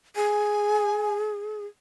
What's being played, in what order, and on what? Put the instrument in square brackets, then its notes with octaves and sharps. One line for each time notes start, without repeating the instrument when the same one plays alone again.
[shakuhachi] G#4 [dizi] G#5